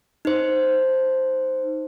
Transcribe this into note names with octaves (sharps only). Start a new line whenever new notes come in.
D#4 C5